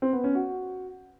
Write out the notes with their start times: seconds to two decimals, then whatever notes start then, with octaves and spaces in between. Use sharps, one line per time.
0.02 C4
0.13 B3
0.24 C#4
0.35 F#4